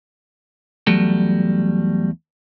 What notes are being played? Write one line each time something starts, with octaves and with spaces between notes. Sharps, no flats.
E2 F#3 G3 A3